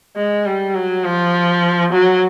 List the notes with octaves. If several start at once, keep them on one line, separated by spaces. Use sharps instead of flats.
G#3
G3
F#3
F3
F#3